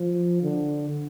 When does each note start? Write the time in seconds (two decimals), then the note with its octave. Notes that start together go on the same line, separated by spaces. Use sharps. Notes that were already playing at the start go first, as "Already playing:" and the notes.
Already playing: F3
0.42 D3